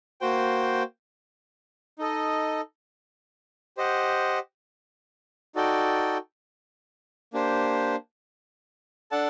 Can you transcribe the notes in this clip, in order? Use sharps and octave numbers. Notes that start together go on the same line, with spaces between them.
A#3 F#4 C5 G5
D#4 A4 D#5
G4 C5 D#5 F#5
D#4 F#4 A4 D5 G5
A#3 D4 G4 C5
D4 A4 D5 F#5 A5